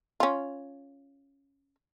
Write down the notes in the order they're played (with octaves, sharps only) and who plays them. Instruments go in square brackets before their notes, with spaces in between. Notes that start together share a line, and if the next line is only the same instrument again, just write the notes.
[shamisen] C#4 F4